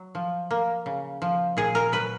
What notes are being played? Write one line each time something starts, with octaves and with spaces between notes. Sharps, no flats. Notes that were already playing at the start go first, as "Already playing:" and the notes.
Already playing: F#3
F3
A#3
C#3
F3
A#2 G#4
A#4
F#3 B4